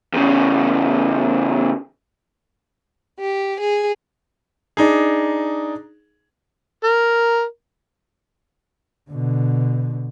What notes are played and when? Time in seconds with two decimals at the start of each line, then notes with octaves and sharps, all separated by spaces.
0.13 E2 C#3
3.19 G4
3.60 G#4
4.77 D4 D#4 G#4
6.84 A#4
9.10 B2 D3